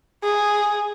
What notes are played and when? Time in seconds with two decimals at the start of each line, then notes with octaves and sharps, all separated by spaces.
0.23 G#4